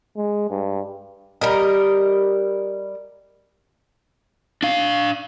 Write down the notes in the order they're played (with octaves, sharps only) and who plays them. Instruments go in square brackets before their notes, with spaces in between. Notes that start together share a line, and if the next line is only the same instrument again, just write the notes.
[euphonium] G#3
G2
[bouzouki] G3 A#4 D#5
[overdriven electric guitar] D4 F5